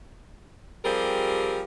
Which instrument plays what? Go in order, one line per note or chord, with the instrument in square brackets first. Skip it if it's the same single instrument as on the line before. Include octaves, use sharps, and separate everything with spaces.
[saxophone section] F3 G3 C4 G4 G#4 A#4